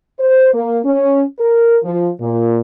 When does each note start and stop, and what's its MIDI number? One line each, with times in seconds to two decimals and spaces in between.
0.19 0.53 72
0.54 0.79 58
0.85 1.23 61
1.39 1.78 70
1.83 2.10 53
2.20 2.60 46